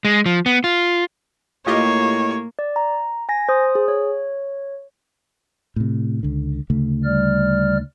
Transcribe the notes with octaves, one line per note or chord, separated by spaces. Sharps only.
G#3
F3
B3
F4
A2 A#3 F4 G4 C#5 D#5
D5
A#5
G#5 A#6
C5 D#6
G#4
C#5
A2 C3
C#2 D3
D2 C#3 A3
G3 D5 F6